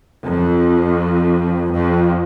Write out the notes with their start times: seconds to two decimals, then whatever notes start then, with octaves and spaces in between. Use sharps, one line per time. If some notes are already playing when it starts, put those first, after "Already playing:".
0.24 F2
1.71 F2